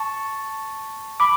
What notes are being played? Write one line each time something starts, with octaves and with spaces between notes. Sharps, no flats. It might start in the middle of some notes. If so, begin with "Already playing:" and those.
Already playing: A5 C#6
B5 D6